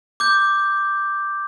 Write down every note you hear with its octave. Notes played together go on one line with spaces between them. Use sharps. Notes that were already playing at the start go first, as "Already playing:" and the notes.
D6 G6